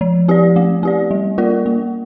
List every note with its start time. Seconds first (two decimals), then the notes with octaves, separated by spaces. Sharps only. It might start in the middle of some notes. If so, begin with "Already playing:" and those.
0.01 F3
0.28 C4 G4 D5
0.56 A3
0.83 C4 G4 D5
1.11 G3
1.38 A#3 F4 A#4 D5
1.66 A#3